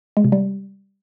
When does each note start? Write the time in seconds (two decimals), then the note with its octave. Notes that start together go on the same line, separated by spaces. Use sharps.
0.17 G#3
0.24 C3
0.32 G3